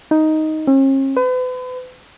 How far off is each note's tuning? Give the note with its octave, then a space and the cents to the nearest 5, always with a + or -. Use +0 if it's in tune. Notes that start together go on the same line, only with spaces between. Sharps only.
D#4 +5
C#4 -45
B4 +40